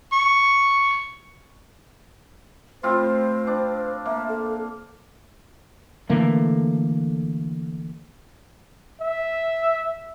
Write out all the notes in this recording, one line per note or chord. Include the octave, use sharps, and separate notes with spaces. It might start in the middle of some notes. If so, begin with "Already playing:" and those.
C#6
A2 C4 F4 C5
D4
A#3 E5
A4
D3 E3 A3 A#3
E5